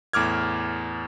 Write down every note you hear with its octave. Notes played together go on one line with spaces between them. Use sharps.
E2 A2 D6 F6 G#6